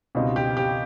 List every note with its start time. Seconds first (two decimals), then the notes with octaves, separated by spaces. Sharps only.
0.15 C#2 B2 G3 C4 D#4
0.36 G4
0.57 G4